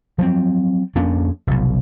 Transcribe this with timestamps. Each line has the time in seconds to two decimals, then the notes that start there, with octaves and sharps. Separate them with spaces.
0.18 F3 F#3 A#3 C4
0.95 F2 A#3 C#4 D4
1.47 F1 B1